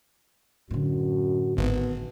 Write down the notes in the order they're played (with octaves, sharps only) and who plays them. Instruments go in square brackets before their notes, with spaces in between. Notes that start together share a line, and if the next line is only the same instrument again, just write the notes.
[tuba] F#2 [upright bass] A2 D3 [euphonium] F#4
[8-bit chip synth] G#1 [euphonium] B3